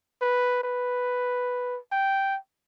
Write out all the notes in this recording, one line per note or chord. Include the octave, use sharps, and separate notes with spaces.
B4
B4
G5